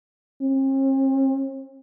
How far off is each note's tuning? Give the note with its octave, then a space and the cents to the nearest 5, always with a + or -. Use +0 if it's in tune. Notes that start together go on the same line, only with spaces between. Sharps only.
C4 +45